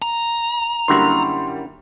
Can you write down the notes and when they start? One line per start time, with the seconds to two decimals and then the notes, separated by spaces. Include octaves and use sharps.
0.02 A#5
0.88 F#2 D3 G3 A#3 E4 F#4 C6